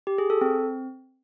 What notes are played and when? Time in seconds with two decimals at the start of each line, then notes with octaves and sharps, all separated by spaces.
0.07 G4
0.18 G#4
0.30 A4
0.41 C4